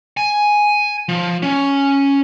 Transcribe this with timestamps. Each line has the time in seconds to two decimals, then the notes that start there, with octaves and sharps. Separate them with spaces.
0.17 G#5
1.09 F3
1.42 C#4